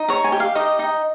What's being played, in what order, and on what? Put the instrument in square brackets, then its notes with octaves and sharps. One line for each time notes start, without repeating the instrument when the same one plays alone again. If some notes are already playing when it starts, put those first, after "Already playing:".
Already playing: [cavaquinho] D#4
C#5 A#5
G#5
G4
F5
D#4 D#5
D#4